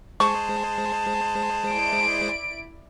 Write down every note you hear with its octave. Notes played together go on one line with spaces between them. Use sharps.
G#3 G#4 C5 A5 C#6
E4 D5 D7